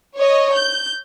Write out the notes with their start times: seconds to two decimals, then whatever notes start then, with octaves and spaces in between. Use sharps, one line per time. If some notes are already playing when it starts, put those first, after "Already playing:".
0.16 C#5 D#5
0.54 G6